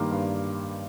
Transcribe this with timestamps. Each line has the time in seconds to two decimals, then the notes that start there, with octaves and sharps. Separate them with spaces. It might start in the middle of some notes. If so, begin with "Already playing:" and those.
Already playing: G2 D#3 G3 A#3 C6 D6 F6
0.11 G2